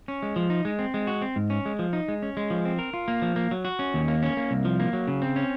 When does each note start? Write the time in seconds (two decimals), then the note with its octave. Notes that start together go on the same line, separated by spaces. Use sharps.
0.08 C#4
0.23 G#3
0.36 F3
0.50 D#4
0.65 G#3
0.79 C4
0.94 G#3
1.07 F#4
1.22 C4
1.36 G#2
1.50 C#4
1.66 G#3
1.79 F3
1.93 D#4
2.08 G#3
2.23 C#4
2.37 G#3
2.50 F3
2.65 C4
2.79 A#4
2.94 F4
3.08 A#3
3.22 F3
3.36 A#3
3.51 F#3
3.65 F#4
3.79 C#4
3.94 D#2
4.08 A#3
4.22 C#4
4.37 A#3
4.51 C2
4.65 F3
4.80 A#3
4.93 F#3
5.07 C#3
5.22 C4
5.36 C#4